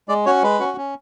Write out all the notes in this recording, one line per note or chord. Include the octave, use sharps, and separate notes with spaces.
G#3 D5
C#4 F#4 C#5
G#3 B4
C#4 F#4
C#4